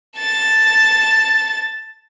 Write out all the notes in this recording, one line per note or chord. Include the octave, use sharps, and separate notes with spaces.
A5 A6